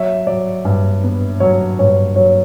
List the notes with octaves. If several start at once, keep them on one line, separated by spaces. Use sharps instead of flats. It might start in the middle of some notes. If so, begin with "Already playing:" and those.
Already playing: F#3 C#5 E5
F#3 D5
G2
B3
F#3 C#5
G2 C#5
F#3 C#5